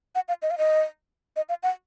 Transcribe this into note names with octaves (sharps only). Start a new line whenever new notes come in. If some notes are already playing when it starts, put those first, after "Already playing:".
F#5
F5
D#5
F5
D#5
D#5
F5
F#5